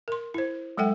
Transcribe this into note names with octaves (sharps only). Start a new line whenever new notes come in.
A#4 C6
E4 C5
F#3 G#3 A4 F#5 G5